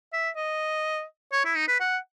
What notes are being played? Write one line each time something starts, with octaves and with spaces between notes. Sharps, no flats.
E5
D#5
C#5
E4
D#4
B4
F#5